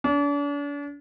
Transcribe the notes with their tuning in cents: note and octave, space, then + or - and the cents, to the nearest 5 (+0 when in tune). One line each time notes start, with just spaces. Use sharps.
D4 -40